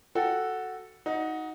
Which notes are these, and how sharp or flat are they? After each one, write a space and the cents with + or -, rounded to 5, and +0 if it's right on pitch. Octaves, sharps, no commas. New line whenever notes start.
F#4 +0 A4 +0 G5 +0
D#4 +15 F#4 -5